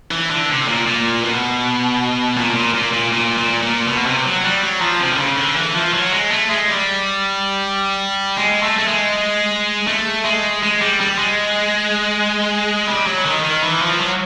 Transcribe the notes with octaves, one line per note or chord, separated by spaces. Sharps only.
E3
D3
C3
A#2
A#2
B2
A#2
A#2
A#2
A#2
A#2
A#2
A#2
B2
C3
F#3
G3
F#3
F3
C3
D3
C#3
D3
E3
F3
F#3
G#3
A3
G#3
G3
G#3
A3
A3
G#3
A3
G#3
G#3
G3
G3
G#3
G3
F#3
D#3
D#3
E3
F3
F#3